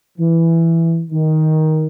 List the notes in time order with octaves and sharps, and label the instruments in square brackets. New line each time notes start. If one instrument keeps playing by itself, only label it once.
[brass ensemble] E3
D#3